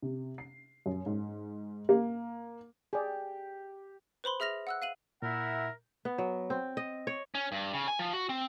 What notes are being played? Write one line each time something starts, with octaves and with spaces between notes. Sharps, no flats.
C3
C7
F#2
G#2
A#3
G4 G#4 D5
B4 C5 B5 C6
G#4 E5 F6 A#6 F7
F#5 E6 F#6
F5 D#7 F#7
A#2 E4 A#4 E5 F#5
B3
F#3
C4
D#5
C#5
C#4
G2
C#3
G#5
F3
F#4
C4